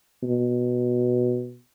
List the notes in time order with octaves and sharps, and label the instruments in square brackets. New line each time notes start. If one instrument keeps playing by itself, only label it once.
[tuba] B2